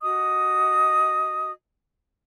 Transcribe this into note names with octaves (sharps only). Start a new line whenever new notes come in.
F#4 D#5 D#6